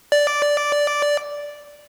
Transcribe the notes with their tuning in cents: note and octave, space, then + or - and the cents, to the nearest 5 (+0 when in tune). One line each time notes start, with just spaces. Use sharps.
D5 -5